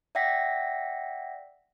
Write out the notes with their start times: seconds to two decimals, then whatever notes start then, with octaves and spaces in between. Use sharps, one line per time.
0.15 D5 E5 F#5 G5 A#6 B6